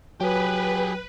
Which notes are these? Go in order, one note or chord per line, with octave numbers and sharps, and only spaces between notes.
F#3 G4 G#4 B4